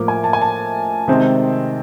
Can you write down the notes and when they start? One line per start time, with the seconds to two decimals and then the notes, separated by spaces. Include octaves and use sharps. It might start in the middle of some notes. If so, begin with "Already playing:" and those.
Already playing: A2 F3 A#3 D6
0.08 G#5
0.24 A5
0.33 G#5
0.42 A5
1.08 C3 D#3 G#3 C4